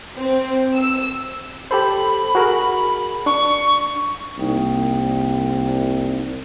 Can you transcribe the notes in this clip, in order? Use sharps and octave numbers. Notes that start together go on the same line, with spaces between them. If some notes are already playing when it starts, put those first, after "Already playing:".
C4
E6
G4 A4 C5 B5
F#4 G#4 A#4
D4 C#6
C2 A#3 D#4 G5